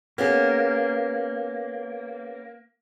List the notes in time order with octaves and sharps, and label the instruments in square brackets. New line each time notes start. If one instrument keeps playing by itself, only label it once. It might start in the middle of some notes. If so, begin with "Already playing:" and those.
[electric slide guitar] A#3 [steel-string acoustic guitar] B3 C#4 G#4